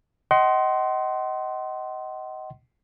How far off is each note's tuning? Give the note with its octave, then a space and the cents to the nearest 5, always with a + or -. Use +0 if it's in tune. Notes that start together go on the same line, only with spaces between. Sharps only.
D#5 +15 F#5 +35 C6 +0